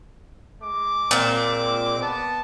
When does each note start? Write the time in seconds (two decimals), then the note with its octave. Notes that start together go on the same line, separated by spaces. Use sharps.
0.61 G#3 D6
1.11 A#2 C4
1.99 B3 A5